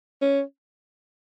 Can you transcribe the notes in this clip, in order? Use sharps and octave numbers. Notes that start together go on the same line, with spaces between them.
C#4